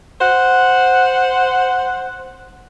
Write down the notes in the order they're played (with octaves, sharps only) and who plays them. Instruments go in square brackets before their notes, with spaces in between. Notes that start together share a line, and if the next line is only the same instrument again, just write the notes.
[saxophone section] C5 F#5